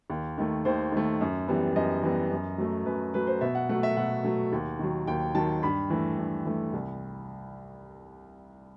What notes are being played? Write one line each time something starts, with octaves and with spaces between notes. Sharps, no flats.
D#2
D#3 A3
D#2 C5
D#3 A3
F#2
E3 G3 B3
F#2 D#5
E3 G3 B3
F#2
F#3 A3
F#2 B4
F#3 A3 B4
C5
B2 E5
F#5
F#3 A3 F#5
E5
B2 F#5
F#3 A3
D#2
D#3 F#3
D#2 G5
D#3 F#3 A5
G2 B5
E3 A3
G2
E3 A3
C2